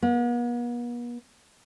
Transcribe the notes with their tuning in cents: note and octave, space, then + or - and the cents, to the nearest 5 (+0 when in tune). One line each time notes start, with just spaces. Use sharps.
B3 -45